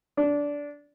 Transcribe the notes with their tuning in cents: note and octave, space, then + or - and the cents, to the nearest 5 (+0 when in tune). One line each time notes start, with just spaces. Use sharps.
D4 -15